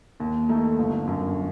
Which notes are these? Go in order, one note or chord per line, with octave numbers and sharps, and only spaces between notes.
D#2
D#3 A3 D#4
G1
F#2 D3